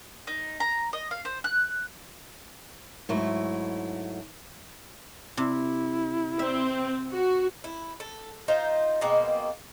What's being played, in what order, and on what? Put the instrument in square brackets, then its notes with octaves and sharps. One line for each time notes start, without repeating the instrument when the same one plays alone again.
[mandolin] D#4
A#5
D#5
F5
C5
F#6
[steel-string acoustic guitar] G#2 F#3 A3 E4
[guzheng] C3 [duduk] E4
[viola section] C4 [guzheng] E5
[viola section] F#4
[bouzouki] E4
A4
D#4 F4 C5
B2 G#3 A#3 C4